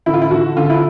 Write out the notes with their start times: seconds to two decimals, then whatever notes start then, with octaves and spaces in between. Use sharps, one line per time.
0.06 D3 E4
0.14 F4
0.22 E4
0.31 D3 F#4
0.57 D3 F4
0.70 E4